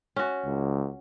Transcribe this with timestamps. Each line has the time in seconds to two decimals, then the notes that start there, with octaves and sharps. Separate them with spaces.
0.16 C#4 F#4
0.45 C#2